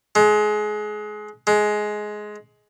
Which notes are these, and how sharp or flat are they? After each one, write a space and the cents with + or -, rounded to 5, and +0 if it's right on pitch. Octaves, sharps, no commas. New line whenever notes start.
G#3 +25
G#3 +15